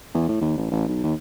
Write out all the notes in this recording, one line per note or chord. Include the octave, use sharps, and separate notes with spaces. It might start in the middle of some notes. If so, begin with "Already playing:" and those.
E2
A2
D#2
A1
A1
B1
D#2